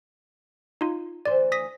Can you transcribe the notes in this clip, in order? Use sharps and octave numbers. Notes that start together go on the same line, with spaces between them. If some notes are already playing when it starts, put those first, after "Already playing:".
D#4 F4
D2 E3 C5 D5
D#6 A#6 B6